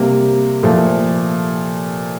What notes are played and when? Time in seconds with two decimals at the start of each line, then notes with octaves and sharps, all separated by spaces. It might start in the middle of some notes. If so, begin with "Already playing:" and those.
Already playing: C3 G3 A#3
0.63 A#2 F3 A3